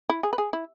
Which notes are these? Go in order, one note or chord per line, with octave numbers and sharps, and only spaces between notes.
E4
G#4
B4
G#4
E4